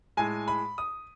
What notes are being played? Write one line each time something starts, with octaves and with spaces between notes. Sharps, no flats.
A2 G#3 G#5
B5
D#6